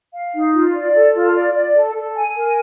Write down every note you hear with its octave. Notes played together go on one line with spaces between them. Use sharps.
F5
D#4
F4
D5
A4
F4
D5
D5
A4
A4
G#5
A#4